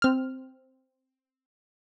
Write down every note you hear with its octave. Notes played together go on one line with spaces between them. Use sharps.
C4 F6